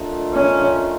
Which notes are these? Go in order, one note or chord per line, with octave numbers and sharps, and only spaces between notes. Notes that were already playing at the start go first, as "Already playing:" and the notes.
Already playing: A3 D4 F4 A#4 D#5
C#4